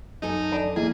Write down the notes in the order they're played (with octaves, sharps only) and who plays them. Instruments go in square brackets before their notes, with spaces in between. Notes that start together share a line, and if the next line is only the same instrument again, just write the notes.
[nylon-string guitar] F#2 A4 G#5 [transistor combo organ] D#4
[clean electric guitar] D4
[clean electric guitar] E2 [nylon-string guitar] A#3 [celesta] E4 D#5 D#7 [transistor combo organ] G#4